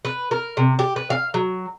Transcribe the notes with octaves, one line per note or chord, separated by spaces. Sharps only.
B4
A#4
C3
G4
B4
F5
F#3